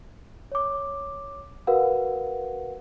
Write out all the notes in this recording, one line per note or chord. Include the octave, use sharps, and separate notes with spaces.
C#5 D6
F#4 A#4 B4 F5 F#5